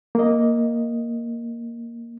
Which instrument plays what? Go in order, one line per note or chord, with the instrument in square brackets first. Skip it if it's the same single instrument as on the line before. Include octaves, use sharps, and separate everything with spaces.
[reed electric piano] A#3 D#5